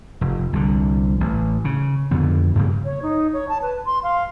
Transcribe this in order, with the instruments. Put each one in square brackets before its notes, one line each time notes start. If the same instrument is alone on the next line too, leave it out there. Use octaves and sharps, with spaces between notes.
[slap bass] F1
C2 D3
A1
C#3
F2 D3 B3
G2 C#3 A#3
[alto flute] C#5
D#4
C#5
A5
B4
C6
F5